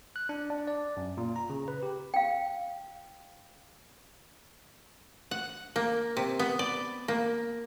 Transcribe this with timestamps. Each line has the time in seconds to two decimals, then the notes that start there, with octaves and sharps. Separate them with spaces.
0.16 F#6
0.29 D4
0.50 D4
0.67 D5
0.97 F#2
1.17 A#2
1.36 A#5
1.50 C#3
1.68 B4
1.83 G4
2.14 F5 G5
5.31 F#5
5.76 A#3
6.17 C3
6.39 B3
6.59 D5
7.08 A#3